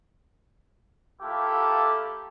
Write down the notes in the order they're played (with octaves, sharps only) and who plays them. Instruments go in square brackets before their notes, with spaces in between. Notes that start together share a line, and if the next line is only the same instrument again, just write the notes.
[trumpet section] A3 A#3 E4 F4 G4 A4